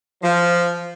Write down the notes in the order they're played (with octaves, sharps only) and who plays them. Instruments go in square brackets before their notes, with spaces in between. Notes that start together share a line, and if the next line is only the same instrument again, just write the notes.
[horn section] F3